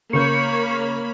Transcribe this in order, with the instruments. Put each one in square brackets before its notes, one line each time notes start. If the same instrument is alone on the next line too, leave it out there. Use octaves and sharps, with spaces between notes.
[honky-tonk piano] C#3 A#4 G6 [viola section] A#3 C#5 B5 [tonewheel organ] C#6